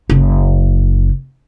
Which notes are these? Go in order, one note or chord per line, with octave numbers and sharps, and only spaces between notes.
F#1 C#3